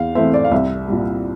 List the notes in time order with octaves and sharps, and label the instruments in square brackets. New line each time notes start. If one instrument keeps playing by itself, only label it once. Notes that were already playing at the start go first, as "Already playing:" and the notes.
Already playing: [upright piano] E2 F5
E3 A3 C4 E5
D5
F5
C2 E5
A#2 G3